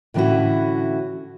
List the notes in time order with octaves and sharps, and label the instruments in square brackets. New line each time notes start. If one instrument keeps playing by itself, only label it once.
[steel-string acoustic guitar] A2 D3 E3 C#4 E4 F#4